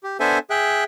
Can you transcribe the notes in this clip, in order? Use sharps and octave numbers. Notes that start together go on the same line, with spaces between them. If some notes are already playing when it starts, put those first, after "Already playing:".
G4
B3 D4 A4 C5 E5 G#5
G#4 E5 G5 F#6